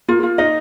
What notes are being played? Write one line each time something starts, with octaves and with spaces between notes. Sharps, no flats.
A#3 F4
F4
D#4 D#5